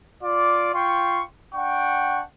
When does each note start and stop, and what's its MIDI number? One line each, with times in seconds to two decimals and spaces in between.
0.23 0.73 65
0.23 0.73 74
0.23 0.73 86
0.74 1.23 65
0.74 1.23 79
0.74 1.23 84
0.74 1.23 85
1.55 2.22 62
1.55 2.22 78
1.55 2.22 79
1.55 2.22 85